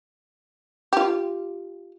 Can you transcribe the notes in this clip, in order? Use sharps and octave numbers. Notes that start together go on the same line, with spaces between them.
F4 G4